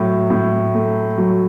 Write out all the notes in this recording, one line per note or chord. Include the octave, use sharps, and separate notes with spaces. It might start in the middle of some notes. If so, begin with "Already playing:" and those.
Already playing: A2 F#3
A2
A3
F#3